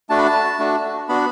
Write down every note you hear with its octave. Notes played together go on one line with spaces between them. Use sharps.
A3 D4 F#4 A5
B5
A5
A3 D4 F#4
B3 D4 F#4 B5